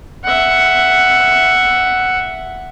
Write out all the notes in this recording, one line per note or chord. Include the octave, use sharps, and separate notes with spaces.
E5 F#5